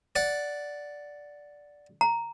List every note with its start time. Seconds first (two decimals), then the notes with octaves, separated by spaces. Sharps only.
0.16 D5 F#5
2.01 A#5